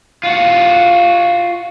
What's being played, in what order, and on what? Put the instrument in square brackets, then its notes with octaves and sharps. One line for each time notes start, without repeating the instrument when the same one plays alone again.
[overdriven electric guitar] F4 F#4